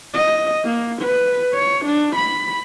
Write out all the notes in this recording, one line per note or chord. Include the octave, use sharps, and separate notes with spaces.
D#5
A#3
B4
C#5
D4
B5